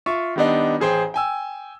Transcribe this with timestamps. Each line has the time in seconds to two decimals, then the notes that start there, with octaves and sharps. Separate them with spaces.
0.06 F4 E5 C#6
0.36 D#3 G3 B3 D4 D#4
0.80 A1 G#4 C5 G5
1.14 G5 G#5 E6